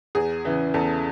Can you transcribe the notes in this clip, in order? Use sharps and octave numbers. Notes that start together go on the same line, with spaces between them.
E2 G#4
C#3 E3
E2 A4